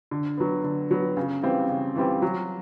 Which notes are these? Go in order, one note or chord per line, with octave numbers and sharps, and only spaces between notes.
D3
F#3 B3
D3
F#3 B3
C#3
E3 G3 C4 F4
C#3
E3 G3 C4 F4
F#3